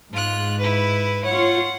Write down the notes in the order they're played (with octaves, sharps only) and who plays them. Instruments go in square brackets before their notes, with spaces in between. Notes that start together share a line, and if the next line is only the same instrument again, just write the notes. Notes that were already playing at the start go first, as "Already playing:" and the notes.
[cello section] G#2 [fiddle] F4 F#6
[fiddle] E4 B4
[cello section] F4 C#5 [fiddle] F#5